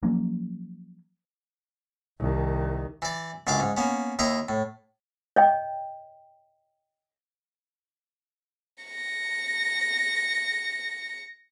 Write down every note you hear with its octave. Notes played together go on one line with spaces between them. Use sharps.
F3 F#3 A#3 C#4
C2 D#3
E3 D5
C#2 F#2 D4 F5 D6
G#2
A#3 B3 C#4
D#2 E4 D#5 A#5 C6
A2
C#5 D#5 G5
A#6 C#7